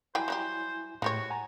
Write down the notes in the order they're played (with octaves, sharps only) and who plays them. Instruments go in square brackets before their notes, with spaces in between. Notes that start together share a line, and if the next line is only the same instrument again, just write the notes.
[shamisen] F#3 G3 G5 [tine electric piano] E4 G#5 [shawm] C5
[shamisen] F#3 G3 G4
[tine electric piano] A2 [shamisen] G#3 G4 C#5 [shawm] F#4
[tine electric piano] F#5 G#5 A#5